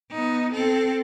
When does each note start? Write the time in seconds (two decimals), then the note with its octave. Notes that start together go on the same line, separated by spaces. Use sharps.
0.11 B3 D#4
0.53 C4 A4